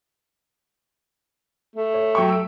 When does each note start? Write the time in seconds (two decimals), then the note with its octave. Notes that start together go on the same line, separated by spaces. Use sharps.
1.76 A3
1.94 C#5
2.15 F#3 G5 C#6
2.29 E6 D7